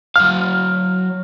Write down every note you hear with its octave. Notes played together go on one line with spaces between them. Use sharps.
F#3 F5 F6